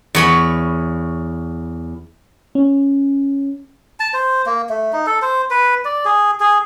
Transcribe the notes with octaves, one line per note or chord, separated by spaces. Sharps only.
E2 C#5 B5
C#4
A5
C5
A#3
A3
D#4
A4
C5
B4
D5
G#4
G#4